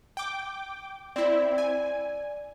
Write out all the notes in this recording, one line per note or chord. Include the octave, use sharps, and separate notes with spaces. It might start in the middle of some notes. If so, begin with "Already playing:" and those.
G5 D6
C4 E4 D5
G#5